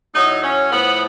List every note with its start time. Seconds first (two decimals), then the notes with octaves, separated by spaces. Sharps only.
0.14 A2 F#3 D#4
0.43 C#4
0.72 A2 F3 B3